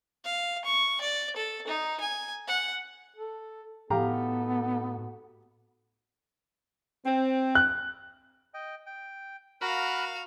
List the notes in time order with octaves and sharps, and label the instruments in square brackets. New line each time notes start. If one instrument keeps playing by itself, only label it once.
[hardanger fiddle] F5
C#6
D5
A4
D#4
G#5
F#5
[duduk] A4
[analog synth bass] A2 [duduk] B3 [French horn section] D#4 F#4 A4 [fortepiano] G4 F5 A#5
[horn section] C4
[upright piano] F#6
[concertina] D#5 G5
G5
[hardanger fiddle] F#4 F5 [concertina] A#4 B5 F#6